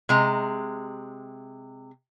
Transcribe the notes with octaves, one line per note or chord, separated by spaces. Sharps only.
C3 G#3 A#5